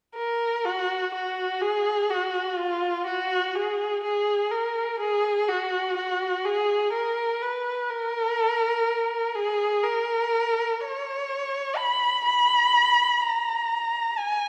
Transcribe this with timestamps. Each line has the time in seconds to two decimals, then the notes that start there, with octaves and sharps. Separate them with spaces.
0.17 A#4
0.65 F#4
1.14 F#4
1.62 G#4
2.11 F#4
2.58 F4
3.07 F#4
3.56 G#4
4.04 G#4
4.52 A#4
5.00 G#4
5.49 F#4
5.97 F#4
6.45 G#4
6.93 A#4
7.42 B4
7.90 A#4
9.35 G#4
9.83 A#4
10.80 C#5
11.77 B5
12.25 B5
13.22 A#5
14.18 G#5